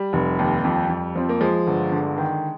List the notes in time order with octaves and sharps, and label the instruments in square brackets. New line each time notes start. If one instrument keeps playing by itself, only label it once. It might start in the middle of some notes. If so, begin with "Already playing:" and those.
Already playing: [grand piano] G3
F1
D#2
F2
F2
F3 C4
A#3
F3 G#3
G1
D3
D#3